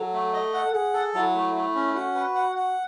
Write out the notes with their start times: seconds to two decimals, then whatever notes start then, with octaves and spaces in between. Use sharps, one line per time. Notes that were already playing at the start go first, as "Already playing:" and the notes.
Already playing: F#3 A4
0.13 A3
0.33 D#5
0.54 F#5
0.73 G#4 F#5
0.93 A4
1.14 F#3 E4
1.35 A3
1.55 A3
1.75 C#4
1.95 F#4 F#5
2.15 B4
2.35 F#5
2.56 F#5